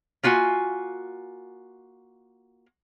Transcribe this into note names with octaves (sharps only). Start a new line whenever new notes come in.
A#3 F4 F#4 E5 G#5